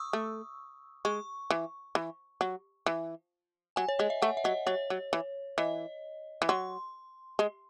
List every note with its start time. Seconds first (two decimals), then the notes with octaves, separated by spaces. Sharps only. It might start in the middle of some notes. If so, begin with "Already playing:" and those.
Already playing: C#6 D#6 E6
0.13 A3
1.05 G#3 C#6
1.50 E3
1.95 E3
2.41 F#3
2.86 E3
3.76 F#3 G#5
3.89 C#5
3.99 G#3 D#5
4.10 E5
4.22 A3 F#5
4.37 E5
4.44 F#3 D#5
4.66 F#3 C#5
4.90 F#3
5.13 E3
5.58 E3 D#5
6.42 E3
6.49 F#3 C6
7.39 G#3